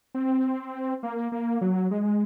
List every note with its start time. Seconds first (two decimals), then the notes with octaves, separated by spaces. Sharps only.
0.14 C4
1.03 A#3
1.32 A#3
1.61 F#3
1.91 G#3